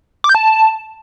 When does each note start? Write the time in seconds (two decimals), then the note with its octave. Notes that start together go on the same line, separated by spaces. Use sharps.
0.24 D6
0.29 G6
0.35 A5